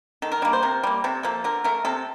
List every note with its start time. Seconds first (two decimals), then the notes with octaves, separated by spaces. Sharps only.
0.22 D#3 A4
0.32 A#4
0.42 G3 A#3 D4
0.53 C5
0.63 C3 A#4
0.83 G3 A#3
1.04 C3 A4
1.23 F3 A#3 A4
1.44 D3 A#4
1.64 A3 A#4
1.85 C3 A4